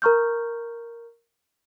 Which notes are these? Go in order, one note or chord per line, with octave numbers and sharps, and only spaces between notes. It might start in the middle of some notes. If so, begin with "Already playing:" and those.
A#4 A#5 C#6 F6 G6